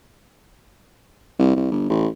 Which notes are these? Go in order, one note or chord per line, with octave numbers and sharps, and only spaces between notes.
C2
C2
G1
A1